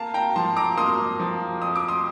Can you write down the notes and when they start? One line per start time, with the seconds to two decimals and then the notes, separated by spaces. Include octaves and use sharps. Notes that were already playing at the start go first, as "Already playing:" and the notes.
Already playing: A#3 F5 A5
0.14 G5 A#5
0.36 F3 A5 C6
0.57 A#5 D6
0.78 A#3 C6 D#6
1.19 F3
1.62 F2 D#6
1.76 D6
1.88 C6 D#6